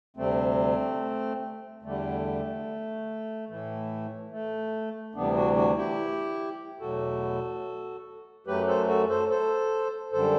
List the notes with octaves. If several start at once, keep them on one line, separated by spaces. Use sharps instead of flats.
D2 C3 G3 A3 C4
E2 D3 G3 A3
A2 E3 A3
A3
D2 C3 E3 G3 B3 D4
D4 F#4
D4 F#4
E4 G4
E2 B2 F#3 A3 F#4 A4
F#2 F#3 A3 G4 B4
A4 C5
F#4 A4
A4 C5
A4 C5
F#2 D3 G3 A4 C5